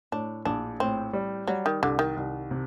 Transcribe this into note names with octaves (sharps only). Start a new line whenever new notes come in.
A2 D4
A#1 D4
A2 C4
G3
F#3 G3
D#3
C2 D3
D#3
C2
C3